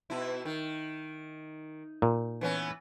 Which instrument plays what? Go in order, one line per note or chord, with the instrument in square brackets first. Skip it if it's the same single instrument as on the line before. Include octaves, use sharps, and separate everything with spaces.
[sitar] B2 E4
D#3
[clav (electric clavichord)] A#2
[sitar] E3 B3 C#4